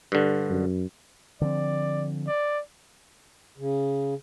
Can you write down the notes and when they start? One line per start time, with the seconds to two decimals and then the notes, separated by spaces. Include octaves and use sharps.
0.12 G2 D3
0.50 F#2
1.41 D3 F3 C4 D5
2.28 D5
3.58 C#3